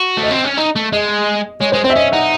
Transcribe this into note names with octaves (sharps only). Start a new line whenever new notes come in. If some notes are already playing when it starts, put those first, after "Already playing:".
Already playing: F#4
A3
D#5
C4
C#4
D#4
A3
G#3 D#5
G#3 C#5
G#3 C5
C4 C5
E5
C#4 D#5
D#4 F#5